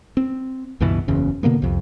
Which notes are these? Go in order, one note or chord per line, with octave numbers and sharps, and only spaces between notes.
C4
C#2 G2 B2 E3
F#1 E2 C#3
B2 D3 A#3 B3
C2 F2